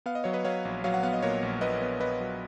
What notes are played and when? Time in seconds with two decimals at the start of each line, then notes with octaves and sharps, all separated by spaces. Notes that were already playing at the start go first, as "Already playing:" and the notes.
0.06 B3 F5
0.15 D#5
0.24 F#3 C#5
0.33 B4 D#5
0.45 F#3 C#5 F5
0.65 A#1
0.84 F#3 C#5 F5
0.94 F#5
1.03 B3 F5
1.13 D#5
1.22 A#2 A#4 C#5
1.43 A#1
1.61 A#1 B4 D#5
1.82 B3
2.00 B3 B4 D#5
2.21 F#3